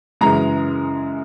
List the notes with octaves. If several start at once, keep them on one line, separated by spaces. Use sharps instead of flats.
F#2 C#3 E3 G#3 A#5